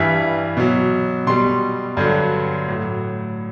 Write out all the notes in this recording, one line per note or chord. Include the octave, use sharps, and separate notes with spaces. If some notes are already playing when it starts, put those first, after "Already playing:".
Already playing: G2 E3 G3 E5
B2 F#3
B2 G3 C6
G2 D3 F#3
A2 F#3